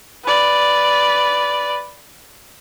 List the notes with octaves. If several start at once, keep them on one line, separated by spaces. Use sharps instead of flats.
B4 D5